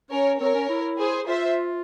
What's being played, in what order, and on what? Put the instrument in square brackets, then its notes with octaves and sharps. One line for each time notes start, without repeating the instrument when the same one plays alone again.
[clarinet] C#4 [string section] A#4 C#5
[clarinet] C4 [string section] A#4 C#5
[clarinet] C#4
E4
[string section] G#4 C5
[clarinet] F4 [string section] C5 E5